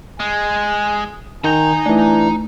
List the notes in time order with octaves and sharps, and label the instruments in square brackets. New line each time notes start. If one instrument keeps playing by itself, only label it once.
[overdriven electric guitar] G#3 [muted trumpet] G#5
[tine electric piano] D#3 G6 [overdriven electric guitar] D#4 A#5 [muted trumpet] G#5
[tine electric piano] E3 D4 [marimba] A3